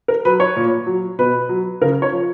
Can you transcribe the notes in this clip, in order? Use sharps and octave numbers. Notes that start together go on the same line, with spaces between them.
A#4
F#3 B4
C#5
A#2
F#3
B2 B4
F#3
C#3 A#4
C#5
F3